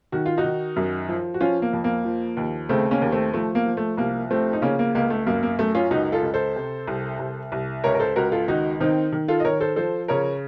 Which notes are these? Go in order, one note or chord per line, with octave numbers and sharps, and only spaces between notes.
D#3 F#4
F4
D#4 F#4
D#3
F#2
F3
F#4
F3 C#4 F4
A#3
F2
A#3
F3
D#2
C#3 A3 C4
A#3 C#4
D#2
A3 C4
F3 A3
A#3
F3
A3
C2 A#3
F3 A3 C4
D#4
C#3 A#3 C#4
A#3
C#2 A#3
A3
F#2 A#3
A#3
F#2 A3
C#4 F4
C#2 D#4 F#4
F4 A4
C#2
A4 C5
C3
C2
C2
C2
C#2 A#4 C#5
A#4
A4 C5
C#2 F#4 A#4
F4 A4
D#3 D#4 F#4
D#3 C4 D#4
D#3
F4 A4
D#5
D#3 A#4 C#5
A4 C5
F3 A4 C5
C#3 A#4 C#5